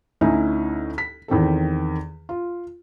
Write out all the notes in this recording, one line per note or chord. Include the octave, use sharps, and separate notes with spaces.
D2 C#4 D#4 E4 G#5
B6
E2 D#3 C4 A4
F4